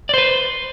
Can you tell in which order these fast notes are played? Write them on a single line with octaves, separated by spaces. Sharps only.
D5 C5 B4